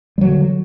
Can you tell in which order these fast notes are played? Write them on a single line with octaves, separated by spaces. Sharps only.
G3 F#3 D#3 D3